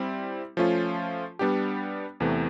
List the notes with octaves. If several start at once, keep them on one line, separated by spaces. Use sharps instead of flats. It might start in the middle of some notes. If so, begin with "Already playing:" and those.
Already playing: G3 C4 E4 G4
F3 A3 C#4 F4
G3 B3 D4 G4
E2 C3 E3 A3